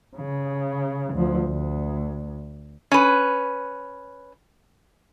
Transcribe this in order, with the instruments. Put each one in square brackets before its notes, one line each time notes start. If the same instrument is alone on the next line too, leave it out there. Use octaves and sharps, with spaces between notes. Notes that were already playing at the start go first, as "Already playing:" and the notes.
[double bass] C#3
D2 F3
D2
[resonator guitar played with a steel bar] C#4 B4